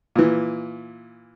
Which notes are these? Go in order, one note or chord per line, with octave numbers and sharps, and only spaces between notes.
A#2 E3